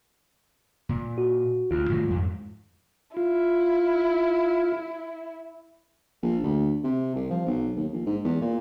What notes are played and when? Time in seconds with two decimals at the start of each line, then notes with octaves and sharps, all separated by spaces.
0.89 A#2
1.18 F#4
1.71 D2 F4
1.90 A2 D#3 F#3
2.08 F2 G#2
3.17 E4 F4
6.22 A#1
6.43 D2
6.84 C3
7.15 C2
7.30 F3
7.47 B1
7.76 D#2
7.93 A#1
8.06 G#2
8.24 E2
8.41 A#2